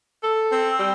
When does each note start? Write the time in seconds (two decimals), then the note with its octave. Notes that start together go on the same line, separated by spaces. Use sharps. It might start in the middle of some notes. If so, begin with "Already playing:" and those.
0.23 A4
0.52 C4
0.80 G3